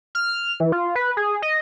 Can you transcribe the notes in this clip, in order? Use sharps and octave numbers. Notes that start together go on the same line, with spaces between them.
F6
E3
F4
B4
G#4
D#5